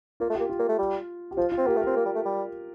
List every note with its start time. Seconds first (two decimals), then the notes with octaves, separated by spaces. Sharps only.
0.20 A#3 F4
0.30 A3
0.35 A#3 G4
0.49 F4
0.59 A#3
0.69 A3
0.78 G3
1.31 G4
1.37 F3 F4
1.52 F4
1.58 C4
1.66 A#3 G4
1.76 A3
1.81 C4 A#4
1.96 A#3
2.05 G3
2.15 A3
2.25 G3